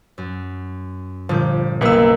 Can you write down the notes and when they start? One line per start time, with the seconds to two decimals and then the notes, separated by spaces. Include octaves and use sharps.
0.18 F#2
1.29 G1 A#2 F3 G6
1.81 F#1 B1 A#3 G#4 B4 E6